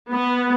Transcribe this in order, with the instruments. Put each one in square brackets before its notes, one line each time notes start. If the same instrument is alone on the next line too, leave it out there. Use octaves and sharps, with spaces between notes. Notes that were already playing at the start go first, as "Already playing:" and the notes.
[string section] B3